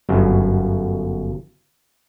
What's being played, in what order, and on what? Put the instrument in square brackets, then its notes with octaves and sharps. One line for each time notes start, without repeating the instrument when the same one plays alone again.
[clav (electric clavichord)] G1 F#2